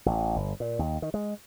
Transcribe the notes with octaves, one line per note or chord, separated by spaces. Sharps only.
A1
G1
A#2
D#2
D#3
G#3